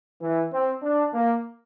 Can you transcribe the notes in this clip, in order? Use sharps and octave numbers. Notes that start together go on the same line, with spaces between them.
E3
C4
D4
A#3